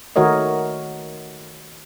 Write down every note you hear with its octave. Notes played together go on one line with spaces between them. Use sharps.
D#3 A3 F#4 A#4 C#5 D#5